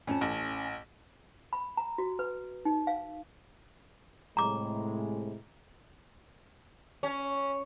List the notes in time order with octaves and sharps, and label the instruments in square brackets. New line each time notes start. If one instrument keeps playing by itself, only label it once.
[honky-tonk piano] F2 [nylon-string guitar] C#4 G#5 A5
[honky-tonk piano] A1
[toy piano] B5
A#5
F#4
B4
D#4
F5
[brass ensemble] A2 C3 G#3 [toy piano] A#5 D6
[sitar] C#4